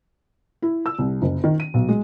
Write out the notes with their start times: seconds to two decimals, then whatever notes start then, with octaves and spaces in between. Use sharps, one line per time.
0.62 E4
0.86 E6
0.98 C2
1.22 F#1
1.44 D#3
1.60 D#7
1.74 B1
1.89 G#3